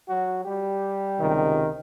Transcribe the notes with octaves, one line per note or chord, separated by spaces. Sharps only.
F#3 F#4
G3 G4
C#2 C3 D#3